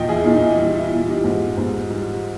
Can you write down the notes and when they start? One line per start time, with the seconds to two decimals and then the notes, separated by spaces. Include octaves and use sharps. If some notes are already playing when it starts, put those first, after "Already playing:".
Already playing: E2 A#2 D#5 G5
0.09 E4 G#4
0.24 A#2 D#4
0.34 D#4
0.42 E4
0.58 G3
0.75 E4
0.91 A#2 E4
1.08 D#4 G4
1.24 G#2
1.57 G#2
1.90 G3